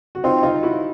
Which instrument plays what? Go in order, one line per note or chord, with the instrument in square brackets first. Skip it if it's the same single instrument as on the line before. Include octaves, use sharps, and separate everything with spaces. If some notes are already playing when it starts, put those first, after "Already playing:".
[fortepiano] F#4
[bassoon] C4 [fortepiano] D#4 F4
[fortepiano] D#4 F4
E4 F#4